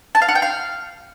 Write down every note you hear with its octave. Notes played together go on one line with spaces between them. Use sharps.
A5
F5
F#5
G5
F5